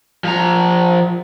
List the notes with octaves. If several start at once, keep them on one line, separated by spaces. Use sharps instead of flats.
F3 A#5